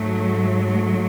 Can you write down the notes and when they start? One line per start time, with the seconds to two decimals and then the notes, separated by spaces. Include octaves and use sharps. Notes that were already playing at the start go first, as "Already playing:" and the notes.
Already playing: G#2 F#3 A3
0.71 A3